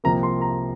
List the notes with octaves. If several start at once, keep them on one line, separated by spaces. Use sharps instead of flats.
C2 C3 F3 A#3 A#5
C6
A#5